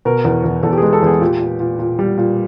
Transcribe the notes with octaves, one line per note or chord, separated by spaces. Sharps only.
B2 A#4
E2
E2
E2 A4
G4
G#3 G#4
A4
E2 G#4
A#2 G4
A#2
A#2
A#2
G3
A#2